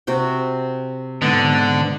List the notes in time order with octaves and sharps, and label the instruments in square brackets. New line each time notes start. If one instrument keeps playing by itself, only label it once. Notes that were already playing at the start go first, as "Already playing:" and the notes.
[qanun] C3 F#4 G5
[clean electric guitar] G#2 B3 [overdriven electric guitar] D3